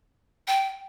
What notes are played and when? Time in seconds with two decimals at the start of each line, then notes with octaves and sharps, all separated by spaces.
0.48 G5